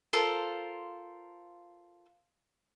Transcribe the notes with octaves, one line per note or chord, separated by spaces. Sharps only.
F4 A4 A#4 C5